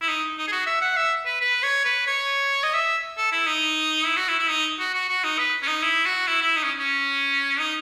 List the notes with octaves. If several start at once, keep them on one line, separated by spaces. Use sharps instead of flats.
E4
D#4
D#4
G#4
F#4
E5
F#5
E5
B4
B4
C#5
B4
C#5
D#5
E5
A4
E4
D#4
E4
F#4
E4
E4
D#4
F#4
F#4
F#4
D#4
B4
C#4
D#4
E4
F#4
E4
E4
D#4
C#4
C#4
D#4